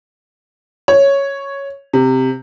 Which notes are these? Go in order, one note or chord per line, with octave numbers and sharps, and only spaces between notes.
C#5
C3